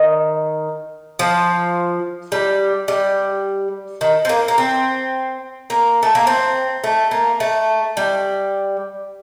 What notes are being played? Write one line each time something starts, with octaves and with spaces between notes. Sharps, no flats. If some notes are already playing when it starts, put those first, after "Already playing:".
Already playing: D#3
F3
G3
G3
D#3
C4
A#3
A#3
C4
A#3
A3
A#3
C4
A3
A#3
A3
G3